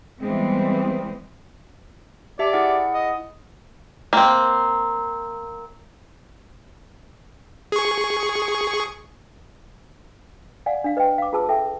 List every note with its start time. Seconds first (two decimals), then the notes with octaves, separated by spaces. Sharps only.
0.20 E3 G3 G#3 B3 C4
2.39 G4 D5 E5 A5
2.53 E4 G#4 F#5
2.94 D#5
4.13 A#3 C4
7.72 G#4 C#6
10.66 D5 F5 F#5 G#5
10.84 D4 F5
10.97 B4 D#5 F5 G5
11.18 F5 D6
11.33 F4 G#4 B4 A5 E6
11.49 A4 E5 G5